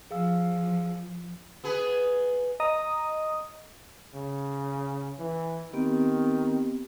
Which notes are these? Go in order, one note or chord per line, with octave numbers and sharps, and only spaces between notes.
F3 G#4 F5 E6
B3 G#4 B4
D#5 A#5 D#6
C#3
E3
D#3 B3 C4 G4